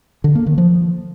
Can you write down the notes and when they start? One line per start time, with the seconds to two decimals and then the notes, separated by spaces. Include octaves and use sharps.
0.24 D3
0.35 A#3
0.46 D#3
0.58 F3